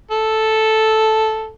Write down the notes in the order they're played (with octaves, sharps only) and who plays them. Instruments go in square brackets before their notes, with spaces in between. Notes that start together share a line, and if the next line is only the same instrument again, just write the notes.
[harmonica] A4